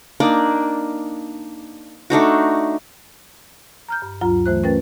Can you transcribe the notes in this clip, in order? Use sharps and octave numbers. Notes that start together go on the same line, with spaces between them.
A#3 D4 D#4 D5
A3 D4 D#4 F#4
A#5 F6 G6
G2
D2 G2 F#3 F4 A#5
E3 A3 C5 F#6
A3 C#4 A#4 B4 G5 A6